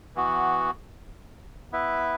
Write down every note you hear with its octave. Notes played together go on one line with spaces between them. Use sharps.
E3 B3 F#4
B3 E4 B4 E5